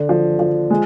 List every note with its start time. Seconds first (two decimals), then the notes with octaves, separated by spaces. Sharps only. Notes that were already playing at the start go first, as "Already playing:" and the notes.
Already playing: D3
0.09 F3
0.39 F3
0.71 G#3